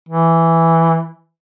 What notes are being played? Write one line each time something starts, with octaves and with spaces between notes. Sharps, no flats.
E3